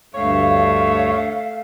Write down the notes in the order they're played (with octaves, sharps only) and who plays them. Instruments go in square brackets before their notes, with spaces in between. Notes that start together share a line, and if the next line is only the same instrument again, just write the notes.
[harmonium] D2 G2 [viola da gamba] A3 [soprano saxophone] C#5 [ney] F5